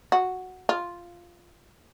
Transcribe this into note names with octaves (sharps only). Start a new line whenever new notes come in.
F#4
F4